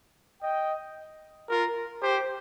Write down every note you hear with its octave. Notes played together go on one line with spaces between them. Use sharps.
D#5 G5
F4 A#4
G4 C5